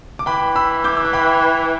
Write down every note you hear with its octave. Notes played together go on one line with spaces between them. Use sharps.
D6
E3 G5 B5
B5 E6
D6 G6
E6
D6
G5 B5